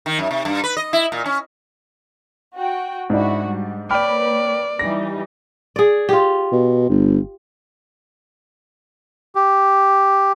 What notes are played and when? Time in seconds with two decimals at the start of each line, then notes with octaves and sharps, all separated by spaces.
0.06 D#3
0.19 F#2
0.31 C3
0.45 G2
0.64 B4
0.77 D#5
0.93 E4
1.12 A#2
1.25 C#4
2.55 F#4 G5
3.10 G#2 D4 E4 F#4
3.47 G3
3.91 A#3 B4 C#5 D5 G5 B5 F6
4.79 E3 G3 D#4 A#6
5.76 G#4 D5
6.09 F4 G4
6.53 B2
6.90 G1
9.35 G4